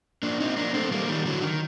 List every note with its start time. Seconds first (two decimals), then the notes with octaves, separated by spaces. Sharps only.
0.23 A#3 D4
0.40 C4 D#4
0.57 A#3 D4
0.74 A3 C4
0.91 G3 A#3
1.09 D#3 G3
1.26 D3 F#3
1.42 D#3